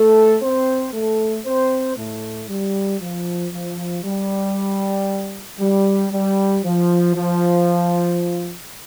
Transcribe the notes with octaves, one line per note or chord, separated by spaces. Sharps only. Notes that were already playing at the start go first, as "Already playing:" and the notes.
Already playing: A3 A4
C4 C5
A3 A4
C4 C5
A2 A3
G3
F3
F3
G3
G3
G3
F3
F3